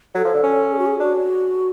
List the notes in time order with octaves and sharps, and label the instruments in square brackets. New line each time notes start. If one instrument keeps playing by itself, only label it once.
[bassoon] F#3 [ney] A4
[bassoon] F3
D3
C#4
[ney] G#4
F#4
G#4
[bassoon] D4 [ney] F#4